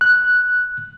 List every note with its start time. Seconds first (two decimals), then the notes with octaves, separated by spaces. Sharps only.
0.01 F#6